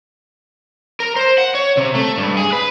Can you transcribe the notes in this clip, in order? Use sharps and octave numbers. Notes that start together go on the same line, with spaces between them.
A#4
C5
F#5
C#5
C3
A3
G2
G#4
B4